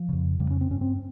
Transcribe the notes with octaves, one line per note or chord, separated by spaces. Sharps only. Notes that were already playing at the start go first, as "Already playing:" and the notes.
Already playing: F3
F2 C#3
F2 C#3 G3
C#4
C4
G2 C#4
C4